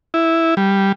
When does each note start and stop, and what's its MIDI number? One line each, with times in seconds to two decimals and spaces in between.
0.14 0.55 64
0.57 0.92 55